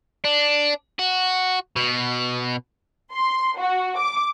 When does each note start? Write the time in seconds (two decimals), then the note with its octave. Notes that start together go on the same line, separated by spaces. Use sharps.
0.25 D4
0.99 F#4
1.76 B2
3.13 C6
3.57 F#4
3.98 D6